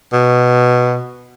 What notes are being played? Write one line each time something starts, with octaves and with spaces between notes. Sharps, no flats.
B2